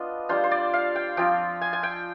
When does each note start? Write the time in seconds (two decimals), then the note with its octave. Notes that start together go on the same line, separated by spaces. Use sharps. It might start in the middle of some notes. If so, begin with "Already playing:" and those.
Already playing: B3 D4 F4 D#5
0.29 G3 D4 F4 C5
0.44 C5
0.51 D5
0.73 F5
0.96 G5
1.17 F3 C4 F4 G5
1.61 G#5
1.73 G#5
1.83 G5